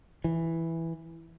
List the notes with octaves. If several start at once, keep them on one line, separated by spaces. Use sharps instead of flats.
E3